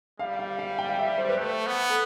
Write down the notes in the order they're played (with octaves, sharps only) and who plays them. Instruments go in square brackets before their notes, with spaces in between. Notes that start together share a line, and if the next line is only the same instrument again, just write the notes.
[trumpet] G3 [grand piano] F5
[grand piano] F5
F5
G5
F5
E5
C5
B4
[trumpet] A3 [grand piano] C5
[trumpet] B3
[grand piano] A4